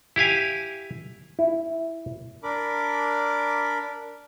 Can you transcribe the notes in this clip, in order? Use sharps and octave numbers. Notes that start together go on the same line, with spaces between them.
E4 G4 F5 G#5
E4
D4 A#4 B5 D6